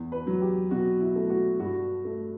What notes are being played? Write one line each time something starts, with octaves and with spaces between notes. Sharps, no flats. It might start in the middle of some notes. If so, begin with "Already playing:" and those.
Already playing: E2
B4
F#3
G4
B2 F#4
E4
A3
F#4
G2 F#4
A3